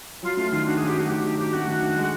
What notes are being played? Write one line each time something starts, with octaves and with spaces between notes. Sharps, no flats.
F#3 F4
A3 F4
D#3 F4
D4 F#4
F#3 G#4
G4
A3 F#4
D#3 G4
D4 G4
F#3 G4
A3 F#4
D#3
D4
G#3